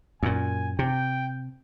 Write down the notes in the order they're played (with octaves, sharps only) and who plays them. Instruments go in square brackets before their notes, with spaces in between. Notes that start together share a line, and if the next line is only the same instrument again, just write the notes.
[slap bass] F#2 A#2 [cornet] G#5
[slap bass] C3 [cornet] G5